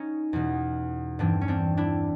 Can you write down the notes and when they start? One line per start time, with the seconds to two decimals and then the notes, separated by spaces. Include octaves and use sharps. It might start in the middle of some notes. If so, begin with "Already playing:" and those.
Already playing: C#4 D#4
0.33 E2 B2
1.19 G2 E3 C4 D4
1.41 C#4
1.48 C4 D4
1.77 D4 E4